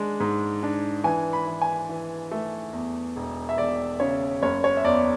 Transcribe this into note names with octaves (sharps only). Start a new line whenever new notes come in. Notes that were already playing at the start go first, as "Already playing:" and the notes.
Already playing: G#3 D4
G#2
D4
E3 G#5
B5
E3
G#5
E3
A3
E2
E1
E5
E1 D5
C#3 C#5
F#1 C#5
C#5
E5
E2 D5